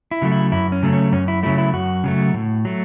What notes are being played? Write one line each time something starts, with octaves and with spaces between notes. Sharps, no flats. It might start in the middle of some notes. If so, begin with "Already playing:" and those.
E4
C#3 F#3 A3
E4
F#2 E4
C#4
C#3 F#3 A3
C#4
F#2 C#4
E4
C#3 F#3 A3 E4
E4
F#2 F#4
C#3 F#3 A3
A2
F#3 A3